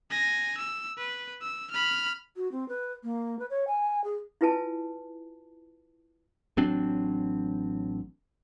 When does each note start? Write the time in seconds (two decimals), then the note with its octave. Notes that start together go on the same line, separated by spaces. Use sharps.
0.10 G#5 A#6
0.57 E6
0.98 B4
1.42 E6
1.70 B5 F6
2.36 F#4
2.52 C4
2.69 B4
3.04 A#3
3.39 B4
3.50 C#5
3.67 G#5
4.04 G#4
4.41 E4 F4 B4 G#5 A5
6.57 A1 F#3 C4 D4